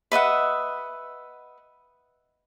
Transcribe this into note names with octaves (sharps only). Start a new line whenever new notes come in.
B4 D#5 E5 F#5